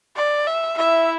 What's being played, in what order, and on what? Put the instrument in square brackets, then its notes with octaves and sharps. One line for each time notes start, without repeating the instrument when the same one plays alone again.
[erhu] D5
E5
[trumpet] E4 [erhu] E5